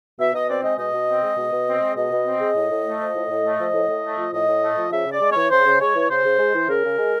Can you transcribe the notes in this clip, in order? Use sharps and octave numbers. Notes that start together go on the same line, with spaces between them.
B2 E5
B2 D#5
C4 D5
G#3 D#5
B2 D#5
B2
C4
G#3
B2
B2
C4
G#3
B2 D#5
B2
C4
G#3
A2
A2
A3
F3
A2
A2
A3
F3
A2
A2
A3
F3
A2 D#5
A2
A3
F3
C#3 E5
C#3
D5
G#3
E3 C#5
C#3 C5
C#3
G#3 C#5
E3
C#3 C5
C#3
G#3
E3
C#3 A#4
C#3
G#3